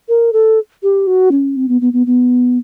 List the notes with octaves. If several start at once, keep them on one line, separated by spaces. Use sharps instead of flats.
A#4
A4
G4
F#4
C#4
C4
B3
B3
B3
B3